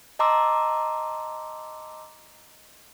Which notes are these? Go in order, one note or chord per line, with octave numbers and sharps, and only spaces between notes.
D#5 A5 A#5 C6 D6 E6